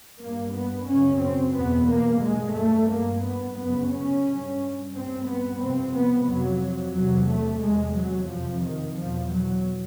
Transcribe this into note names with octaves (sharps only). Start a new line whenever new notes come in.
G2 A#3
B3
F#2 C#3 C#4
C4
E2 B2 B3
A#3
G2 G#3
A3
G2 A#3
B3
F#2 C#3 B3
C#4
G2
G2 C4
B3
F2 C3 C4
B3
F2 C3 F#3
E2 C3 F#3
A3
E2 C3 G#3
F#3
F2 C3 F3
D#3
E2 B2 F3
F#3